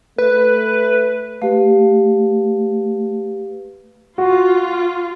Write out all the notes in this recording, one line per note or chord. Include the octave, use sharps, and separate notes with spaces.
A3 B4
A3 G4 B4 F5
F4 F#4